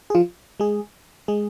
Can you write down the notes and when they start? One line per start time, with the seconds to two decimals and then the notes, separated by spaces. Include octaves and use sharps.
0.10 G#4
0.15 F3 F4
0.60 G#3 G#4
1.28 G#3 G#4